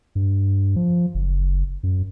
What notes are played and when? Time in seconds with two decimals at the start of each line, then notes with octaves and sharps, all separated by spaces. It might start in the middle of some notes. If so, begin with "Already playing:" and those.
0.15 G2
0.76 F3
1.14 F#1
1.83 F#2